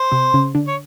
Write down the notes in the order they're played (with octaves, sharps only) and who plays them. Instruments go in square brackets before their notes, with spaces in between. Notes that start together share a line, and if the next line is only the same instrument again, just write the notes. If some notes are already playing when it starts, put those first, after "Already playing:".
Already playing: [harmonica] C5
[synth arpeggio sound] C3 C4
C#3 C#4
D3 D4
[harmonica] C#5